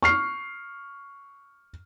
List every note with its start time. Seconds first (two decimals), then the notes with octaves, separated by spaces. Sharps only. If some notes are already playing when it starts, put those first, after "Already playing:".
0.02 C#6 F6 C7